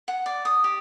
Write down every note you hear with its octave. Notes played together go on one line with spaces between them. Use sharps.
F#5
D5
D#6
G4